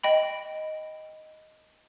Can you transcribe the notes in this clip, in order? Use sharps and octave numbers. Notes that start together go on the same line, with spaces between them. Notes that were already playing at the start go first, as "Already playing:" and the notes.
D#5 G5 B5